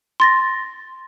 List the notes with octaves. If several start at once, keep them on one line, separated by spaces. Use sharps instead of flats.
C6 A6 A#6